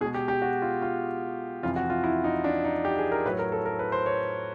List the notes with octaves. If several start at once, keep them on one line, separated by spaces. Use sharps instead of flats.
B2 G#3 G#4
G4
G4
F#4
F4
F4
F2 C3 E3 F4
F#4
F4
E4
D#4
D4
D#4
G4
G#4
A#4
A2 F#3 B4
A#4
A4
A#4
B4
C5
C#5